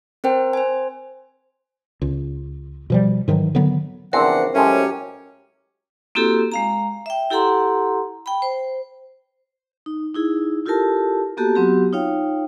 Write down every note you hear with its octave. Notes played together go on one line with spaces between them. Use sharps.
C4 A#4 C5 G5
C5 G#5
C#2
B2 F3 G3
G#2 D#3 E3 F#3
D3 D#3 F#3 B3
E2 C#3 F3 C4 D4 A#4 C5 F#5
A2 F#3 G#3 C#4 G4
A#3 C4 E4 F#4 G4 A4
G#3 F5 A#5
E5 G5
E4 G4 A4 F#5 A#5 C6
G5 B5
C5
D#4
D#4 E4 G#4
E4 F4 G4 A4 A#4 A5
A#3 B3 F#4 G4 A4 A5
F#3 B3 C4 F#4 G4
D#4 F4 C#5 F5 G5